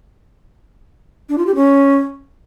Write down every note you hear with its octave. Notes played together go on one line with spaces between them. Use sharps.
D4
F4
G4
C#4